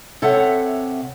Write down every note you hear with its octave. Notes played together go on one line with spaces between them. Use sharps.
C3 A4 C#5 E5 F#5